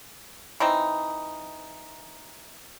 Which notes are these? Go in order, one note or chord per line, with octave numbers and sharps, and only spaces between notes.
E3 C4 D#4